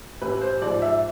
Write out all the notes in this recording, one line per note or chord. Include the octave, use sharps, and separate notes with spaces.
A1 B4
C5
G#2 F3 D5
E5